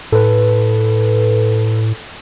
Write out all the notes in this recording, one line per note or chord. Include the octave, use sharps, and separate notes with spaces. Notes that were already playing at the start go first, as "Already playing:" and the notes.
A2 A4 B4